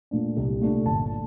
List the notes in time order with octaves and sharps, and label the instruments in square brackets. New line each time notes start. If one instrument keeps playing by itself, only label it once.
[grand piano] A#2 A3 D4
C2
A#2 A3 D4
G1 A5